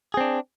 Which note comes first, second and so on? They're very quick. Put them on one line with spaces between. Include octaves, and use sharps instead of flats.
G#4 C4 D4